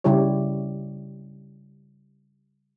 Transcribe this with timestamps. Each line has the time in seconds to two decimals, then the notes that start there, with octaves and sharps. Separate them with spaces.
0.04 C#3 G3 E4 G4 C#5